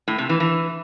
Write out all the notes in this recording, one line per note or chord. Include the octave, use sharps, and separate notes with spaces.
A2
C3
E3
E3